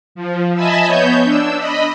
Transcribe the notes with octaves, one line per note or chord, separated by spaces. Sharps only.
F3
D#5 E5 G#5 A5 B5 E6
B3 C#5 G6
D4 E6
D#5 B5